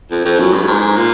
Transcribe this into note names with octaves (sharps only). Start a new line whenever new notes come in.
F2
F2
F#2
G2
A2
G#2
A#2